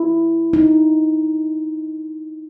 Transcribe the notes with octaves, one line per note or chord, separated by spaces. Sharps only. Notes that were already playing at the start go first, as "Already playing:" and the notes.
Already playing: E4
D#4